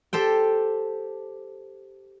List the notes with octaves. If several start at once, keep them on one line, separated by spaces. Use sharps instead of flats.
G4 A4 C5 G5